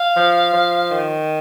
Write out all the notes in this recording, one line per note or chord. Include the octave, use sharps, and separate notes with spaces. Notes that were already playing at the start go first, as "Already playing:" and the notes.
Already playing: F5
F3
F3
D#3